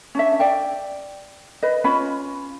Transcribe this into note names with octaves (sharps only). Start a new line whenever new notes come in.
C#4 D4 E5
D5 E5 G5
B4 D#5
C#4 F4 B4 B5